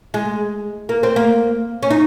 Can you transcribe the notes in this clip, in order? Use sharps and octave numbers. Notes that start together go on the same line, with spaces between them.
G#3
A#3
C4
A#3
C#4
D#4